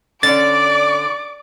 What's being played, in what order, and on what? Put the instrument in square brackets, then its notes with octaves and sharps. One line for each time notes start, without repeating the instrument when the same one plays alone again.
[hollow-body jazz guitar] D3 C#4 D4 [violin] D5 [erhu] D6 [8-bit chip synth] A6